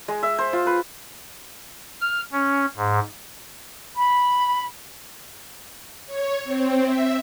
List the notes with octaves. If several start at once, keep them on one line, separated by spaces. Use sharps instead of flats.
G#3
E5
C5
F4
B4
F6
C#4
G#2
B5
C#5
C4
E5